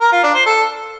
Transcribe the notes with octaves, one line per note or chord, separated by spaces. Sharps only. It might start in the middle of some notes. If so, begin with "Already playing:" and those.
A#4
F4
D4
C5
A4